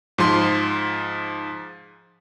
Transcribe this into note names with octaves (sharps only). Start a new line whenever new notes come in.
G#2 F3 C6